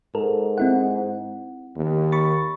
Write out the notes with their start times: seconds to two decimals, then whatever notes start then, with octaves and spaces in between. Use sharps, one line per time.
0.15 G#2 A4 A#4
0.58 C4 E4 F#5
1.76 D#2
2.12 B5 C#6 A6